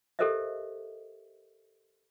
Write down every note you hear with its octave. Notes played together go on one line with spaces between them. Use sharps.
G4 A4 A#4 C5 D#5 E5